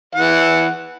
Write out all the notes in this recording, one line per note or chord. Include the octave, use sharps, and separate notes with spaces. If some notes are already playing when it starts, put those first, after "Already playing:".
E3 F#5